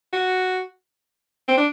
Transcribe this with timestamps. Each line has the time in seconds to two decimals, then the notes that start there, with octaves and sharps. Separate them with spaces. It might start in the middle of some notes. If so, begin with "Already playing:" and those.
0.13 F#4
1.48 C4
1.57 D4